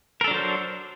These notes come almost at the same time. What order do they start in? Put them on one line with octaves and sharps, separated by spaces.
A#4 A4 D4 F#3 C5